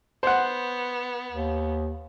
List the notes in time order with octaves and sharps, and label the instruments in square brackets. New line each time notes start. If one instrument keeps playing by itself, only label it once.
[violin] B3 [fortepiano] C5 F#5
[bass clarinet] D#2